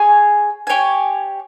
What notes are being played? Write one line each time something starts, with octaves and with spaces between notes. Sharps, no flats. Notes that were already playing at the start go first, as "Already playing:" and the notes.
Already playing: G#4 C#5 G#5
G4 C#5 G#5